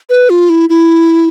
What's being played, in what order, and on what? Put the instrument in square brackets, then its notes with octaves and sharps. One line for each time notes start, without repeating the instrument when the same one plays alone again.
[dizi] B4
F4
E4
E4